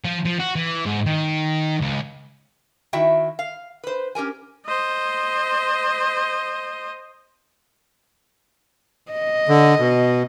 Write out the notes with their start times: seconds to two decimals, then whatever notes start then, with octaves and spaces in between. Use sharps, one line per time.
0.05 F3
0.25 F3
0.39 F#4
0.56 E3
0.86 G#2
1.06 D#3
1.81 C#2
2.93 D#3 E4 F#4 E5 G5
3.39 F5
3.84 B4 C5
4.15 C#4 G4 A#4 G#5
4.66 C5 D#5
9.12 D#5
9.49 D3
9.79 B2